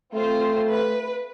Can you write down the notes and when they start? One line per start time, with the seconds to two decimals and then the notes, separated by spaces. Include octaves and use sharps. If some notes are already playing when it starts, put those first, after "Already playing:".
0.14 A3 C4 F4 C5
0.70 B4